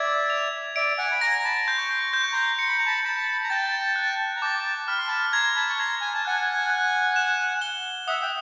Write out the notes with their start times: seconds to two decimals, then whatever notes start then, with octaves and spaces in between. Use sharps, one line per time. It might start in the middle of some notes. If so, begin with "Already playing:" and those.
Already playing: D5 E5 G#6
0.30 F7
0.76 D5 E5 D7
0.98 F#5 G#5
1.12 B5
1.21 G#5 A#5 A#6
1.39 A#5
1.44 A5 B5
1.67 C6 G6
1.77 C#6
1.89 C6
1.99 C#6
2.11 C6 G6
2.22 C#6
2.32 A#5 C6
2.59 C6 C#7
2.68 B5
2.78 A#5
2.86 A5 B5
3.04 A5 B5 C#7
3.44 A#5
3.50 G5 A5 A6
3.96 F#6
4.36 A#5
4.41 G5 A5 D6
4.88 B5 F6
4.98 C6
5.08 A5 B5
5.33 A#5 C6 G#6
5.55 A5 B5
5.69 C#6
5.79 A#5 C6 G#6
6.01 G#5
6.15 A5
6.25 F#5 G#5 F#6
6.70 F#6
7.16 E7
7.62 G7
8.07 E5 F#5 D#6
8.22 G5